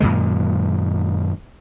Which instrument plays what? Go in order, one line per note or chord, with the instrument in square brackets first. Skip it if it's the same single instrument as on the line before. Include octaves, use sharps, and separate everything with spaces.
[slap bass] F#2 A#2 D#3 G#3